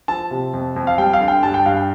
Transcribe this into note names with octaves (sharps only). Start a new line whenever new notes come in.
F3 A5
C3
F2
F2
F5
G3 G5
F5
D3
G5
G2 A5
G5
G2 F5
G5